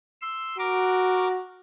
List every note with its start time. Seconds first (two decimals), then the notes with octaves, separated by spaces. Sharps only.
0.22 C6 E6
0.58 F#4 A#4 D6